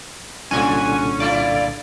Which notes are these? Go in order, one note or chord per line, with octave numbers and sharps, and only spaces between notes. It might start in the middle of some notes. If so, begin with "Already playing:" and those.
C2 F#2 A#2 D3 C#4 D4 F#4 G#5
A3 E4 F4 D5